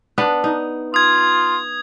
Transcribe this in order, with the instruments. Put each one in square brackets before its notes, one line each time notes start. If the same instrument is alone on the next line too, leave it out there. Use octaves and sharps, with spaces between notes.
[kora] B3 D4
D#4
[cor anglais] F4 [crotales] D#6 G#6